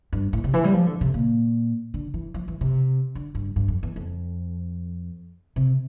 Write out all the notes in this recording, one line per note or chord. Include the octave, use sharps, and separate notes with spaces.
G2
A2
C3
E3
G3
F3
D3
C3
A#2
D3
E3
F3
E3
C3
D3
G2
G2
F2
E2
F2
C3